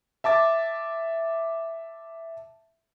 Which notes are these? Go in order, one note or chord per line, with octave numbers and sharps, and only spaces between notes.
E5 A5 D6 A6